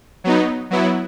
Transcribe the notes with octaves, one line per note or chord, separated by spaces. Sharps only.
F#3 B3 D#4
F#3 B3 E4